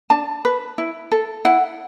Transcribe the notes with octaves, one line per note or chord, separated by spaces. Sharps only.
D4 A5
B4
E4
A4
E4 F#5